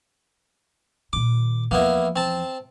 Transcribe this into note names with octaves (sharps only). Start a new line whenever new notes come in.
A#2 D#3 D6
E2 F3 A#3 B3 E4
C4 A5